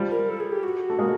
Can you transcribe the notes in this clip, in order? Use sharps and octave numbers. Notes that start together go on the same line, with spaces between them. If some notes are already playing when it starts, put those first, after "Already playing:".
Already playing: F3 G3
A#4
A4
G#4
G4
F#4
A3
G#3 A#3